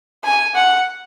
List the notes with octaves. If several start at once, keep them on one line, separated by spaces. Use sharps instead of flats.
G#5
F#5